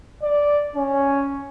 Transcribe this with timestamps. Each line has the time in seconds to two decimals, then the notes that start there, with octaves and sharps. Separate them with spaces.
0.23 D5
0.75 C#4